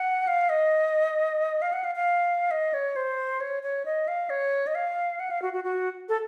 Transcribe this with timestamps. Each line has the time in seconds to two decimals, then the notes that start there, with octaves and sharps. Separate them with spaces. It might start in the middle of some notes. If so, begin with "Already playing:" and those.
Already playing: F#5
0.27 F5
0.49 D#5
1.62 F5
1.73 F#5
1.84 F5
1.95 F5
2.51 D#5
2.74 C#5
2.96 C5
3.40 C#5
3.63 C#5
3.85 D#5
4.08 F5
4.30 C#5
4.67 D#5
4.75 F5
5.20 F#5
5.31 F5
5.42 F#4
5.53 F#4
5.64 F#4
6.09 A4